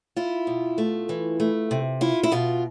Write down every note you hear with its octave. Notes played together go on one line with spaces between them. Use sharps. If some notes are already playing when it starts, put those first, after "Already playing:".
E4 F4
B2
A3
E3
A3
C3
E4 F4
E4
B2 F4